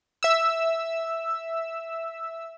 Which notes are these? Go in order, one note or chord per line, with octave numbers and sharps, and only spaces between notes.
E5 E6